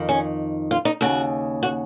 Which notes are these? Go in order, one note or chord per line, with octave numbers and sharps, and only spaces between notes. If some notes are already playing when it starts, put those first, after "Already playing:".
Already playing: F2 D#3
C#4
F4
D#4
D#2 C#3 F#4
F#4